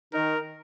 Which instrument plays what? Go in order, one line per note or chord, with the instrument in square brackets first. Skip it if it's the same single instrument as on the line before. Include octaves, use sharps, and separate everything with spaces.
[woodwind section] D#3 D#4 [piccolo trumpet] A#4